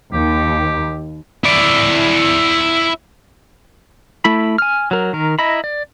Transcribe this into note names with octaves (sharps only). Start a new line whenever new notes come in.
D#2 G4
E4 D5
A3 E4 B5
G#5 F6
F#3 A#4
D#3 A#4
E4 D#5 A#5 B5
D5